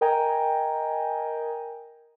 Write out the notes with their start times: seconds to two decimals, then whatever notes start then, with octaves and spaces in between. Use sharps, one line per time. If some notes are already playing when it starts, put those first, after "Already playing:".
0.01 A#4 D#5 G5 G#5 A#5